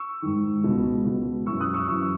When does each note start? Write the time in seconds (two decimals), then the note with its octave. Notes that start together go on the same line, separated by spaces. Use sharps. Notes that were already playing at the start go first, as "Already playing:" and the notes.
Already playing: C#6 E6
0.22 G#2 D#3
0.64 C#2 B2
1.05 C#2 B2
1.46 E3 C#6 E6
1.50 F#2
1.61 D#6 F#6
1.74 C#6 E6
1.88 F#2 E3 C#6 E6